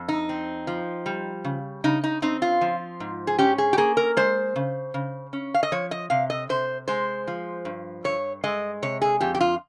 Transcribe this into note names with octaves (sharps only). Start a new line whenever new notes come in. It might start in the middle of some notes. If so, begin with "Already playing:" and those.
Already playing: F2
D#4
C4
F3
G3
C#3
C#3 D#4
D#4
C4 D#4
F4
F3
G#2
G#4
C#4 G4
G#4
G4
A#3 G#4
A#4
G#3 C5
C#3
C#3
C#4
F5
D#5
F3 C#5
D#5
C3 F5
D#5
C3 C5
G#3 C5
F3
G2
G2 C#5
G#3 D#5
C3 C#5
G#4
F2 G4
G4
F4